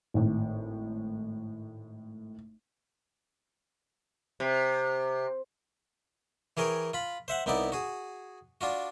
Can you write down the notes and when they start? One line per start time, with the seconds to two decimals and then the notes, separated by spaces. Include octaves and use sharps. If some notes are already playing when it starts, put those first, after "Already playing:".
0.14 G#1 A2
4.40 C3
6.57 E3 G#4 A#4 C#5 G5
6.94 F4 B5
7.28 C5 E5 F#5
7.46 C2 B3 D#4 E4 D5
7.72 F#4 G#4
8.61 D4 F4 F#4